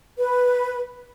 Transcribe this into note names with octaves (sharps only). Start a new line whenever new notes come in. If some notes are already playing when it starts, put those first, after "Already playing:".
B4